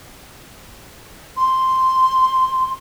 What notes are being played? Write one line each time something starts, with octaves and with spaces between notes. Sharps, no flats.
C6